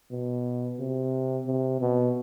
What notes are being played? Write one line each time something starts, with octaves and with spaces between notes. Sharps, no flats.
B2
C3
C3
B2